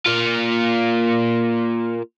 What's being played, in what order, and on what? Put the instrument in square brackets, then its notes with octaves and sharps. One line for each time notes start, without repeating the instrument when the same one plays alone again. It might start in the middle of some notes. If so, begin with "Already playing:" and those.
[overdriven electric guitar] A#3 F4